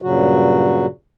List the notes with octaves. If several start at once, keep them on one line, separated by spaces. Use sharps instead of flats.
G2 A#2 C#3 F#3 F#4